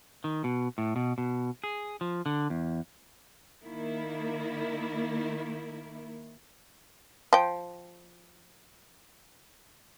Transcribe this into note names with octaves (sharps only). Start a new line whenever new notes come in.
D#3
B2
A2
B2
B2
G#4
F3
D3
E2
D#3 A#3 E4
F3 G5